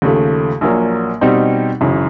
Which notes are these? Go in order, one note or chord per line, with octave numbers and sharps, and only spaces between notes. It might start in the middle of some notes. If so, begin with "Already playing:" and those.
D#2 C#3 F3 A3
A#1 A#2 F#3 A#3
B2 G3 C4 D#4 G4
G#1 F#2 C#3 E3